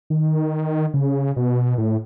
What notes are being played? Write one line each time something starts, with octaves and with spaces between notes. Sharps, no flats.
D#3
C#3
B2
A2